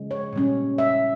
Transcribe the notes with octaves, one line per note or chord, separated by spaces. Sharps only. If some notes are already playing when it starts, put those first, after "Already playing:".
Already playing: C#3 F3 G#3
C#5
A#2 G3 C#4
E5